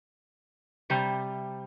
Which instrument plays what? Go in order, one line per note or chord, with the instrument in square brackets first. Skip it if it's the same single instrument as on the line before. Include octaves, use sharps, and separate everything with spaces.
[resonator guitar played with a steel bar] C3 G3